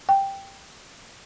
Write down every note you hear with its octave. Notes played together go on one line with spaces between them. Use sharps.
G5